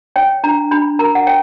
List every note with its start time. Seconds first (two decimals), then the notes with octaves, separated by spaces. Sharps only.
0.16 C#5 G5
0.44 D4 A#5
0.71 D4 B5
0.99 A#4 A#5
1.15 F#5
1.27 C#5 G5